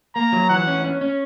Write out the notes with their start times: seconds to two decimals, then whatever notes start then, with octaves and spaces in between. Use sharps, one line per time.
0.16 A#3 A#5
0.32 F#3
0.49 E3 F#5
0.67 C#4
0.84 C#4
1.01 C#4